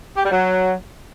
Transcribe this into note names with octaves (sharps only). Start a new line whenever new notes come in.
G4
G3
F#3